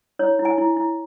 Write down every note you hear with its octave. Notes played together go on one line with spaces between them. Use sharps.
E4 C#5
E4
G#5
E4
E4